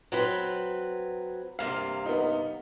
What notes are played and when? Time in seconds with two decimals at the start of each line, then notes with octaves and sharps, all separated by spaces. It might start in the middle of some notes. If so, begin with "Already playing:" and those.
0.12 F#3 C4 B4
1.59 G2 C3 A#3 F5
2.06 B3 D#4